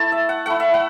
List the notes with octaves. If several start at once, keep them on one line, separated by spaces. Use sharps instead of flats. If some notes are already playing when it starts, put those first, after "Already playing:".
Already playing: A3 E4 A5 B5
E5
F#5
A3 E4 F#5
E5
F#5